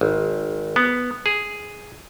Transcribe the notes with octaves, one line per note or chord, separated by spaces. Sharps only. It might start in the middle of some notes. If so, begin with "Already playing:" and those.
G#1
B3
G#4